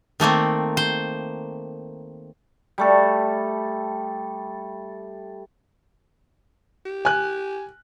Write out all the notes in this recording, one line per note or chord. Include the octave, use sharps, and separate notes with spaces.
D#3 A3 A#3 C4
C5
G3 A3 A4
G4
G#5 F#6